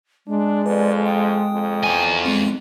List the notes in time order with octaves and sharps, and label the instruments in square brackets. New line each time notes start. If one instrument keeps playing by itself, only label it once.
[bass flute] G#3 [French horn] D4
[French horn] F2 [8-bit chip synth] B4 D5
[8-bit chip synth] G5 D#6
[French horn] F2
[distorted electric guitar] E2 G#5
[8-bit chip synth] G#3 C4